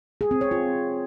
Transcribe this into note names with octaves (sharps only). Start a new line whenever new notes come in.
G#4
C4
C#5
F4